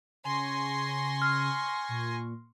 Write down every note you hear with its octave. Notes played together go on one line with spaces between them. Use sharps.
C#3 G#5 C6 C#6 A#6
F6
A#2